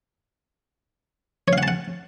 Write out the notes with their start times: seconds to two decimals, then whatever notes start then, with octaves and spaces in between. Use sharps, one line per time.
1.48 C#5
1.53 F5
1.58 F#5
1.63 A5
1.68 F#5